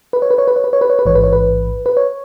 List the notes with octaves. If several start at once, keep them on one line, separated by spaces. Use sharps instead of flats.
B4
C#5
B4
C#5
B4
C#5
B4
C#5
B4
C#5
B4
A1 G#2 E3 C#5
B4
C#5
B4
B4
C#5